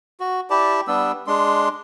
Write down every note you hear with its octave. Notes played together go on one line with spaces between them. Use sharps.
F#4
E4 G4 D5 A5
G3 B3 D4 E6
G#3 D4 C6